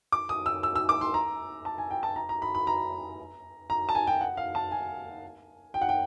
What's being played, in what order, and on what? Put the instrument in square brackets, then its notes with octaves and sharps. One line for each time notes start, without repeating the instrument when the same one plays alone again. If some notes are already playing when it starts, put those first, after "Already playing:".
[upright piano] D6
D#6
E6
E6
E6
D6
C6
A#5
A5
G#5
G5
A5
A#5
A#5
B5
B5
A#5
A#5
A5
G#5
G5
F#5
F5
A5
G#5
G5
F#5
G5